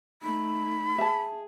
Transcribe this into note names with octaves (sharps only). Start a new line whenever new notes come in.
A3 D#4 B5
G#4 E5 A5